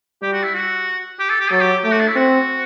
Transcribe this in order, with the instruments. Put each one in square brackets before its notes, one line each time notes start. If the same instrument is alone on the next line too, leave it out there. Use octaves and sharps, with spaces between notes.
[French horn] G3 [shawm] G4
[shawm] F#4
E4
F#4
G4
A4
G4
[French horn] F#3 [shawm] A4
[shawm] G4
[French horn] A3 [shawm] G4
[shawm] F#4
D4
E4
[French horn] C4 [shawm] F#4